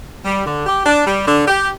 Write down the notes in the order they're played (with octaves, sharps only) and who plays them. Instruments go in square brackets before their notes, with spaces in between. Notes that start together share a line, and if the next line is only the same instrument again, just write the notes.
[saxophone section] G3
D3
G4
D4
G3
D3
G4